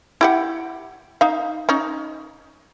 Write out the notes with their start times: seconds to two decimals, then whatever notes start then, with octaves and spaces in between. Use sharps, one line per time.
0.21 E4 G4 F#5
1.21 D#4 F5
1.69 C#4 D#4